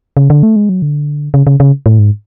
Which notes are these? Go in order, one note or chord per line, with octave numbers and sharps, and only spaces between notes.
C#3
D3
A3
G#3
F#3
D3
C#3
C#3
C#3
A2
G#2